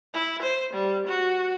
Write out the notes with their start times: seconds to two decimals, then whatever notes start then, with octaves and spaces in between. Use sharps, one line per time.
0.14 E4
0.42 C5
0.73 G3
1.07 F#4